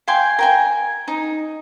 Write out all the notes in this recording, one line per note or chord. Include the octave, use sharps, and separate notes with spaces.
F5 G5 G#5 C6
A#4 G5 G#5
D#4